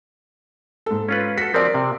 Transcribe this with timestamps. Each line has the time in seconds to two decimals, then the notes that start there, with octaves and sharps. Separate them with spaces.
0.86 G#2 A4
1.09 C#4 F4 B4
1.38 F#4 A4 B6
1.54 F3 C4 A#4 D5
1.74 C3